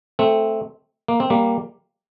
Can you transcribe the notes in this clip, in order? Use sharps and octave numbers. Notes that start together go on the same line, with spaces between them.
A3 C4
A#3
C4
G3 A#3